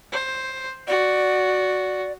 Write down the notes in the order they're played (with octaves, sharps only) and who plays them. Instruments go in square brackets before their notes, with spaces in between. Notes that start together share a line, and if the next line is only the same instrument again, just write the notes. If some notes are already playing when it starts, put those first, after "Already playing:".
[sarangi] C5
[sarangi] F#4 [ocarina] D5